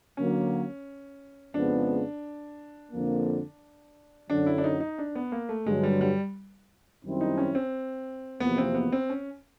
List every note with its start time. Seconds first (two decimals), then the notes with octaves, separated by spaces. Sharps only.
0.17 D3 F#3 A#3 C#4
1.54 F2 C#3 F3 G#3 B3 D4
2.92 F2 D3 F3 A#3
4.29 F#2 D3 F#3 D4
4.46 E4
4.58 D4
4.64 D#4
4.80 D#4
4.98 D4
5.15 B3
5.32 A#3
5.49 A3
5.66 G2 D3 F#3 G#3
5.83 G3
6.01 G3
7.03 F#2 D#3 G3 C4 E4
7.21 D#4
7.38 C#4
7.55 C4
8.40 E2 C3 F3 A#3 B3
8.58 C4
8.75 B3
8.92 C4
9.10 C#4